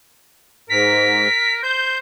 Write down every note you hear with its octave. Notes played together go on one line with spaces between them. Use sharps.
G#2 A#4 B6
C5 G6